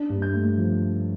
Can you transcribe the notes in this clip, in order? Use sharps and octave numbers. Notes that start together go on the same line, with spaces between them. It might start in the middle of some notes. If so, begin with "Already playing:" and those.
Already playing: D4
G2
G6
A3
F3